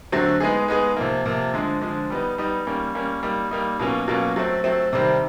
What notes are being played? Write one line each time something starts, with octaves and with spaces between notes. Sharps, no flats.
D3 F#3 A3 C4
G#3 B3 D#4 G#4
G#3 B3 D#4 G#4
C3 F3 A#3
C3 F3 A#3
D3 F3 G#3
D3 F3 G#3
G3 B3 D#4
G3 B3 D#4
G3 A#3 C#4
G3 A#3 C#4
G3 A#3 D#4
G3 A#3 D#4
B2 F#3 A#3 C#4 F4
B2 F#3 A#3 C#4 F4
F#3 A3 C4
F#3 A3 C4
C3 D#3 G3 C4